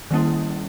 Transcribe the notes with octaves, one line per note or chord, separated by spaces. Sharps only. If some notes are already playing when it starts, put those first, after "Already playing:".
D#3 G3 A#3 C#4 E4